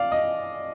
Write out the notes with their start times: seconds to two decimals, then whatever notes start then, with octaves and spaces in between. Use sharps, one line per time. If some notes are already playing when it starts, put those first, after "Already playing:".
Already playing: D5 F5
0.12 D#5